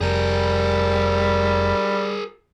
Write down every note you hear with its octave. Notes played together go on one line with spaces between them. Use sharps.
F1 G3 G#4 A#4